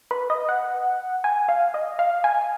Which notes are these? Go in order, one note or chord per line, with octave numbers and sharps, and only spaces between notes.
B4
D#5
F#5
G#5
F5
D#5
F5
G#5